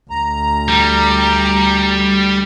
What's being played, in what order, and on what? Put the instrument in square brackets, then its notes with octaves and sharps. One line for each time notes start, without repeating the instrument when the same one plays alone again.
[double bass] D2 [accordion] A#5
[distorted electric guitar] G3